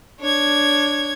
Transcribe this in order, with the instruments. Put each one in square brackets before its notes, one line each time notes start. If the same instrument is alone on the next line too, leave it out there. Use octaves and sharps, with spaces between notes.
[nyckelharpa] D4 [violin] C#5 G#6